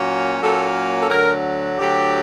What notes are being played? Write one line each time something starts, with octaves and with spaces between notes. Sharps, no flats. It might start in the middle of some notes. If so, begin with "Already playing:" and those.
Already playing: A#2 F#3 A#3 C#4
A#2 F#3 A#3 C#4 A4
A4
D2 D3 F#3 A#4
D2 D3 F#3 G4